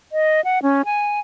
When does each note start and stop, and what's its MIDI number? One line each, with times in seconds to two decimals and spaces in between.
0.12 0.41 75
0.44 0.59 78
0.63 0.82 61
0.85 1.20 80